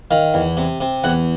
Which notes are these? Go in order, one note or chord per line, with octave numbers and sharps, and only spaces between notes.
D#3 F5
E2
C3
C3
E2 F#5